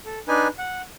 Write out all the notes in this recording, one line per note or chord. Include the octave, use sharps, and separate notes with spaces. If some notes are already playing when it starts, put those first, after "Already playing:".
A4
D4 D#4 B4 G#5
F#5